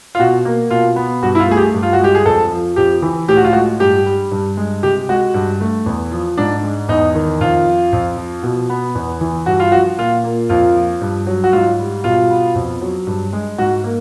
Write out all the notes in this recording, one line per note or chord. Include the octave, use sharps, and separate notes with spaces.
F4
B2 F#4
A#3
B2 F4
B3
G2 F#4
E4
F4
A3 G#4
G4
G2
F4
F#4
G#3 G4
G#4
F2 A4
F3
F2 G4
E3
A2 G4
F#4
F4
G#3 F#4
G2 G4
G3
G2
G#3
C3 G4
G#3 F#4
G2
A3
E2
F3
G#2 D4
G#3
E2 D#4
D#3
F2 F4
F3
F2
F3
B2
B3
E2
E3
G2 F#4
F4
F3 F#4
A#2 F4
A#3
F2 F4
F3
G2
F#3
F#4
G#2 F4
G3
B2 F4
B3
F2
F#3
G2
G#3
G#2 F#4
A#3